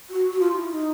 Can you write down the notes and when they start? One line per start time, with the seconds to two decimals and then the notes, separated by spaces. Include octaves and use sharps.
0.09 F#4
0.33 F#4
0.40 F4
0.55 E4
0.70 D#4